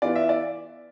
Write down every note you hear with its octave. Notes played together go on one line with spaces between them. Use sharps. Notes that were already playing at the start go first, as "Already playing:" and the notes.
E3 B3 F4 D5
E5
D5